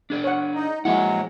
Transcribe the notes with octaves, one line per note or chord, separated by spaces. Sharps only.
D4 G#4 D5
C#5 F#5
D#4
F3 F#3 G#3 A#3 E4 F#5